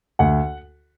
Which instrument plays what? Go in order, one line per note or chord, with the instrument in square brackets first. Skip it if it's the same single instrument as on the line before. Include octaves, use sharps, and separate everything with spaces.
[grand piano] D2 F#5